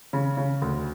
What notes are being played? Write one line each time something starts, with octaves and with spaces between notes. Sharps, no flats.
C#3
C#3
D2